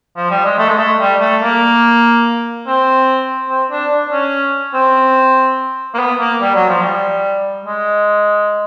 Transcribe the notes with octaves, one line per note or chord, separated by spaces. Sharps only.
F3
G3
G#3
A3
G#3
A3
G3
A3
A#3
C4
C4
D4
D4
C#4
C4
A#3
B3
A#3
G3
F#3
F3
G3
G#3